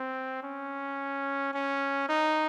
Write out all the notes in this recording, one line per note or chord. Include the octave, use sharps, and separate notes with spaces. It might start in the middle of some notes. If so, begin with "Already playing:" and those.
Already playing: C4
C#4
C#4
D#4